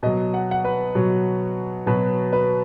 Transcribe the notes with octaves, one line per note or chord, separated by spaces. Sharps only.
B2 F#3 D#5
F#5
F#5
B4
B2 F#3
B2 F#3 B4
B4